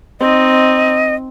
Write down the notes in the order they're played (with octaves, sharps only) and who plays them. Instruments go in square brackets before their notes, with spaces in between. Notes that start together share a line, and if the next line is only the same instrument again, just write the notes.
[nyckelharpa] C4 D#4 [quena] D#5